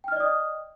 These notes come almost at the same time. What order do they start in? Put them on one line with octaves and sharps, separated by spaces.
G5 F6 D#5 D5 D#6